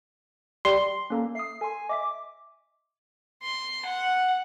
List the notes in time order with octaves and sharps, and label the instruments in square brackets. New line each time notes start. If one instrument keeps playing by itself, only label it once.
[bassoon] G3 [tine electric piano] C6
[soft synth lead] A#3 [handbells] C#4 A4 A#5
[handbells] E5 D#6 [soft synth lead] C7
[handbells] A4 C6 [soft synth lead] G#5
[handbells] D#5 E5 B6 [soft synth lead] D6
[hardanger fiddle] C6
F#5